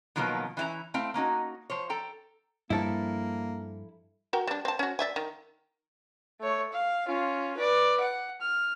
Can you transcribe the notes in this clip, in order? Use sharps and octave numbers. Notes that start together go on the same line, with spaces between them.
B2 D#3 F3 F#3 A#3 B3
E3 C#4 E4 G#5 A#5
A3 C4 E4 F5 G5
A#3 C#4 D#4 F#4
F3 C5 C#5
A4 G5 A#5
G2 F3 A#3 E4 A4
F#4 A#4 G5
G3 D4
C4 A5
C#4 F#4
D5 E5 G#5
D#3
A3 C#5
F5
C#4 F4
B4 D5
F#5
F6